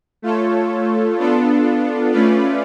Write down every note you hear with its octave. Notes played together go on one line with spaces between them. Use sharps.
A3 F4 A4 C#5
B3 D4 F4 A4
A3 C#4 F4 B4 D5